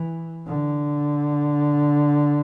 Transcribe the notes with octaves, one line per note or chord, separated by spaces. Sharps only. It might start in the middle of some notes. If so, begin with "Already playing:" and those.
Already playing: E3
D3